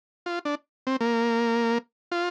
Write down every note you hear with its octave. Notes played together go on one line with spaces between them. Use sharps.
F4
D4
C4
A#3
F4